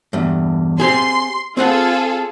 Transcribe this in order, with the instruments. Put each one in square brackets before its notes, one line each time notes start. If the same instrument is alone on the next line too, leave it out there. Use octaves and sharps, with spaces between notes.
[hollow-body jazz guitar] E2 G2
[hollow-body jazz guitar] C4 G4 G#4 [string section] C6
[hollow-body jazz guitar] C4 C5 F#5 [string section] F4 G#4 A4